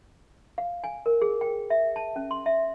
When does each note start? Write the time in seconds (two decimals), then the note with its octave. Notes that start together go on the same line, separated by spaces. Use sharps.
0.58 F5
0.84 G#5
1.06 A#4
1.22 G#4
1.41 G5
1.70 E5
1.96 A5
2.16 C#4
2.31 C6
2.46 E5